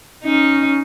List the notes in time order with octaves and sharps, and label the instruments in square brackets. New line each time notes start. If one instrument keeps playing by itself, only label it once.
[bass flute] C#4 [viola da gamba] D#4